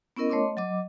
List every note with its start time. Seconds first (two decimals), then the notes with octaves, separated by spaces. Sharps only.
0.17 B3 C#4 E4 A#4 D#5
0.30 A3 C#5 D#5 C6 D6
0.57 F#3 D#5 D6